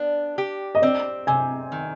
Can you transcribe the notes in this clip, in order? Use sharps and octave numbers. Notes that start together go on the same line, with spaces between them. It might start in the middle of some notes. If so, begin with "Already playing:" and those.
Already playing: B3 D4
G4
D#5
C4 D5
C3 G#5
D#3